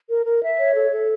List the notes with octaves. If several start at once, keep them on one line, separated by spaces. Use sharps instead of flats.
A#4
A#4
E5
C#5
A4
A4